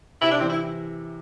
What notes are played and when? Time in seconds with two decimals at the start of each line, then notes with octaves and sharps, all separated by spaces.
0.22 C3 E4
0.31 D4
0.39 E3 C4
0.49 E4